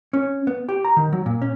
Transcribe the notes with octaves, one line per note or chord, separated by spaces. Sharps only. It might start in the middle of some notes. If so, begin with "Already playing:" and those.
C#4
B3
G4
A#5
D#3
F#3
A#2
C#4